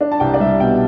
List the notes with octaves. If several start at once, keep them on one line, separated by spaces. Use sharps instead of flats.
D4
A5
C2 G5
D5
G3 E5
B2 G5